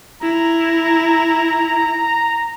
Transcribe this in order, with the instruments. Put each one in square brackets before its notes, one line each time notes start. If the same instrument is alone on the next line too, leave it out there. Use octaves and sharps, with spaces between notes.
[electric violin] E4 [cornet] A#5